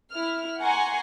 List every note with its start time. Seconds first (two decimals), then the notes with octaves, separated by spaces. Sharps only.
0.13 E4 F6
0.61 F#5 G#5 A#5 C6 C#6